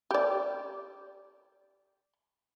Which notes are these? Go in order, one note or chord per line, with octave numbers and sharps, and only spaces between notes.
G4 D5